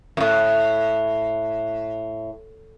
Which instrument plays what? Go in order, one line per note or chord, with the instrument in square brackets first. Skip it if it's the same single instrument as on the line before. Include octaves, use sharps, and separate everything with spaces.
[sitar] F#2 A2